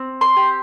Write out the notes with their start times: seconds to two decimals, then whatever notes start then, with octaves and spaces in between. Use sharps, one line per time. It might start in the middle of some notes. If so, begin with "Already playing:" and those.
Already playing: C4
0.21 C6
0.37 G4